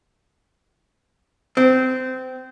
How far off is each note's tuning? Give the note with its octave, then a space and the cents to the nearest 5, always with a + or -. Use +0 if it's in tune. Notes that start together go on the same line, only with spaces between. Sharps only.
C4 -20